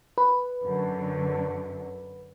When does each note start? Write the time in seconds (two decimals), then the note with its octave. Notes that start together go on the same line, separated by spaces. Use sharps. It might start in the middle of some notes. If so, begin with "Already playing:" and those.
0.18 B4
0.63 F#2 D3